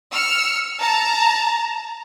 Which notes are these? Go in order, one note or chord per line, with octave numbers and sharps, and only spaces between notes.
E6 F6 C#7
A5 A#5